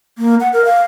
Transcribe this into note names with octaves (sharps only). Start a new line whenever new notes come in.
A#3
F#5
A#4
F5